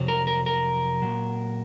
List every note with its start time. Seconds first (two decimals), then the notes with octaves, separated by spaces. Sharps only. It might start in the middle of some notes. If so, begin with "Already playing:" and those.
Already playing: F2 C3 F#3
0.08 A#4
0.27 A#4
0.46 A#4
1.02 A#2 F#3